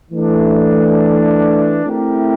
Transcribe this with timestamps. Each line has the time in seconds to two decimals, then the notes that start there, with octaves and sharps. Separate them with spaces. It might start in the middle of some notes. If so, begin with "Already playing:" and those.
0.11 E3 A3 D4
1.83 A3 C4 E4 G4 A#4